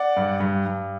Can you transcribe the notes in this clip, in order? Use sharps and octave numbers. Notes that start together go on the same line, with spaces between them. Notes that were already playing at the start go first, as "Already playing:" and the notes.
Already playing: D5 F#5
G2
G2
G2